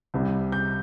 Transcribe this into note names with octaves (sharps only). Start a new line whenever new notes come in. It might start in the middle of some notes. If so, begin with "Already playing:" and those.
C2 C3 G3
G6